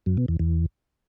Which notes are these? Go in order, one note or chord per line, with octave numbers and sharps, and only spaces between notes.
F#2
B2
E2
E2